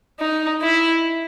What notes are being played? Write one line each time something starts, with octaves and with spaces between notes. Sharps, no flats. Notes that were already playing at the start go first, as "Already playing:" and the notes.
D#4
E4